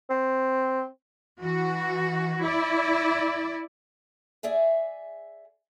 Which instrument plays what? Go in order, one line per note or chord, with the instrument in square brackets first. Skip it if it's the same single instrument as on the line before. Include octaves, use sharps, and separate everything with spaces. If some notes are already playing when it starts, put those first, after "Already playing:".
[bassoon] C4
[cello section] E3 F#4
E4 D5
[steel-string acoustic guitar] G#4 D5 E5 G#5